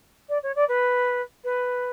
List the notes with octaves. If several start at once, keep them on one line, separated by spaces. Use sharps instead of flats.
D5
C#5
D5
B4
B4